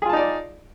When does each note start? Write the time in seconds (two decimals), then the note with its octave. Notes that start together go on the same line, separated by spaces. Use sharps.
0.02 G#4
0.06 F4
0.09 A5
0.13 D#4
0.17 D5